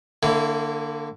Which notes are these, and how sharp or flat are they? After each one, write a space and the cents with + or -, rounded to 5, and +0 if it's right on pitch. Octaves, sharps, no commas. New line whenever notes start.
D3 +15 A#3 -25 E4 +0